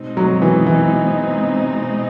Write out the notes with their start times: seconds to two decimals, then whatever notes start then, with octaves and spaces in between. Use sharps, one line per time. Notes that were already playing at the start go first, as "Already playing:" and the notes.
Already playing: B2 G#3 C4 D#4
0.17 F#3
0.42 E3
0.66 E3